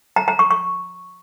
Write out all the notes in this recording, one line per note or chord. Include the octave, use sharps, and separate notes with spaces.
A#5
A#5
C#6
C#6